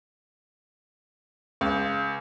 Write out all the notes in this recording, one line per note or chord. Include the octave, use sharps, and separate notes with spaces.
C#2